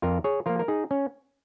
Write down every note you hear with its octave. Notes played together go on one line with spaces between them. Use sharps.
F2 F4 A#4
G#4 C#5
F3 A#3 F4 A#4
A#4
D#4 G#4
C#4